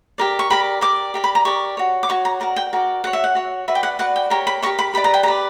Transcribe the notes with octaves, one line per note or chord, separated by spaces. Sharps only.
G4 A#4 D5
C#6
G4 A#4 D5 B5
G4 A#4 D5 D6
G4 A#4 D5
B5
A#5
G4 A#4 D5 C#6
F#4 C#5
D6
F#4 C#5 C#6
A#5
F#4 A#4 D5 A#5
G5
F#4 A#4 D5
F#4 C#5 F#5
E5
F#5
F#4 C#5
F#4 B4 D5 E5
G5
F#5
F#4 B4 D5 F#5
G5
G4 A#4 C#5 A#5
B5
G4 A#4 C#5 C#6
B5
G4 B4 D5 B5
A#5
G5
A#5
G4 B4 D5